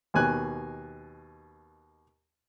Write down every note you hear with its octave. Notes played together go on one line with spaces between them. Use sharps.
D#2 B2 G#5 F#6